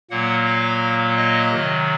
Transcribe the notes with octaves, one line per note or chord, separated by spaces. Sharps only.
A#2 F#3 A#3 F#5
F5
D#5
C3 D#3 F#3